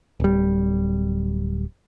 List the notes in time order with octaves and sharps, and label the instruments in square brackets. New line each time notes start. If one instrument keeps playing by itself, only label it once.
[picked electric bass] D1 G3